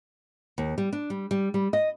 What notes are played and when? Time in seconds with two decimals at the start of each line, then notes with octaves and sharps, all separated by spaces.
0.58 D#2
0.78 G3
0.93 D4
1.10 G3
1.31 G3
1.54 G3
1.73 D#5